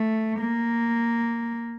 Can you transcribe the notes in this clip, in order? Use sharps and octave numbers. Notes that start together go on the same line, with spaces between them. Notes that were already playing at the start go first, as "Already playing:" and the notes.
Already playing: A3
A#3